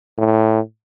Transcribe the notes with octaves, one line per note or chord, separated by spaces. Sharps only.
A2